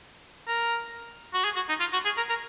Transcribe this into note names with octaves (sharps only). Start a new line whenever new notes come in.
A#4
F#4
G#4
F#4
D#4
F4
F#4
G#4
A#4
A#4